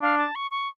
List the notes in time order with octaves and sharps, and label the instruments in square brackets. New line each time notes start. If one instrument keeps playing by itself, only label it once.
[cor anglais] D4 [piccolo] F5
[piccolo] A5
C#6
C#6